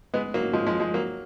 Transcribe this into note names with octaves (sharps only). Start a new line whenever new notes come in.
G#3 B3
F#3 A#3
F3 G#3
F3 G#3
F3 G#3
F#3 A#3